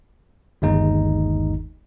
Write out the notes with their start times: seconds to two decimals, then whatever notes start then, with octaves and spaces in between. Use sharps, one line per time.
0.62 G1 D#2 G#3 D#4